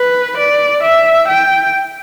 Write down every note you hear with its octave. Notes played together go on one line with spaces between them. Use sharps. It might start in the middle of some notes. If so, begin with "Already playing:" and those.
Already playing: B4
D5
E5
G5